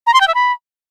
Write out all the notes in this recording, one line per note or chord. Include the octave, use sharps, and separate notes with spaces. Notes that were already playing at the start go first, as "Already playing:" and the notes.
A#5
C6
G5
E5
B5